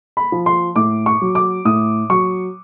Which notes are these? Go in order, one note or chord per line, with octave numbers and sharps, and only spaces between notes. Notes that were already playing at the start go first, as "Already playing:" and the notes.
B5
F3
C6
A2 D6
C#6
F#3
D6
A2 D#6
F#3 C#6